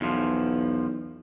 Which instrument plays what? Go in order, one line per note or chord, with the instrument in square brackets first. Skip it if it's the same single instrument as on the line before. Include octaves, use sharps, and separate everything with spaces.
[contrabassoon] B1 [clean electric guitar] E2 F3